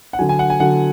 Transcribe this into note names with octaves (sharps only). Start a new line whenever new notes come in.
F#5
D3 F#3 G#5
G#5
F#5
G#5
D3 F#3 F#5